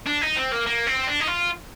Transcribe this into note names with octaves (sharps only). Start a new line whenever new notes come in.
D4
D#4
C4
A#3
A#3
C4
D4
D#4
F4